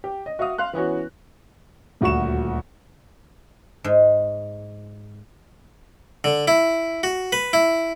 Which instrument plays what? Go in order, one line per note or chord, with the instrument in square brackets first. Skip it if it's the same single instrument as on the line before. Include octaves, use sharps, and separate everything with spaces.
[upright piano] G4
D#5
F#4 E5 F5 D#6
F5 C6 F#6
E3 B3 C#4 F#4
[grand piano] D#1 D2 F#4 C#6 E7
[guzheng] G#2
[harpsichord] D3
E4
F#4
B4
E4